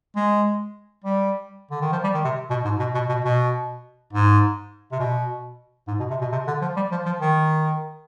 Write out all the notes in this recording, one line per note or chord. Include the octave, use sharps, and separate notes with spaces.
G#3
G3
D3
D#3
F3
G3
D#3
C3
B2
G#2
B2
B2
B2
B2
G#2
C3
B2
G#2
B2
C3
B2
C3
D3
F3
G3
F3
F3
D#3